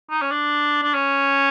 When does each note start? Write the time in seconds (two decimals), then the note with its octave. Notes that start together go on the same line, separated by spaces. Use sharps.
0.10 D#4
0.22 C#4
0.31 D4
0.82 D4
0.94 C#4